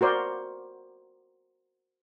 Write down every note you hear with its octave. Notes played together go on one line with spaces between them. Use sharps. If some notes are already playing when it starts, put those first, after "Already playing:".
F#4 A#4 C5 D5